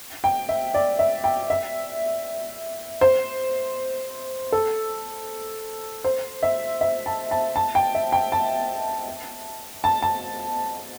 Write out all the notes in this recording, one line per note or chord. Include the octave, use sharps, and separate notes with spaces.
G5
E5
D5
E5
G5
E5
C5
A4
C5
E5
E5
A5
A5
A5
G5
E5
G5
A5
A5
A5